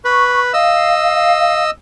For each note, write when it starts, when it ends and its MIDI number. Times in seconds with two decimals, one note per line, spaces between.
0.05 0.53 71
0.05 0.40 85
0.54 1.71 75
0.54 1.63 77
0.54 1.71 88